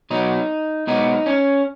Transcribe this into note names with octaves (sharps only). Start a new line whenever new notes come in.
B2 F#3 B3 D#4
B2 G#3 B3 D#4
C#4